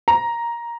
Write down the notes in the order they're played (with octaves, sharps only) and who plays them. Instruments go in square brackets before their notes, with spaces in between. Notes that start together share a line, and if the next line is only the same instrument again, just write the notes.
[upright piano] A#5